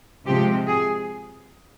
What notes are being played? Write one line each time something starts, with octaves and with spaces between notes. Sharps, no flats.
C3 F3 G#3 G4
G#4